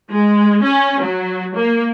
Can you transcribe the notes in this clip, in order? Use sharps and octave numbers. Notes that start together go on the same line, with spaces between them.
G#3
C#4
F#3
A#3